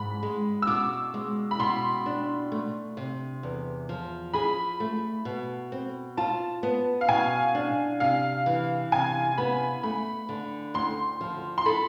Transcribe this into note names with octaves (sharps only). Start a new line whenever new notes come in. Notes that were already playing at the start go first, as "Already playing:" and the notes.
Already playing: G#2 B5
G#3
E6
B2 D6
G#3
B5
B2 C6
D4
A3
C3
E2
F3
G#4 B5
A3
B2
C4
F4 A5
B3
F5
B2 G#5
D4
C3 F5
E3
C3 G#5
B3 B5
A3 B5
D3
D2 C6
F3
C6
A4 B5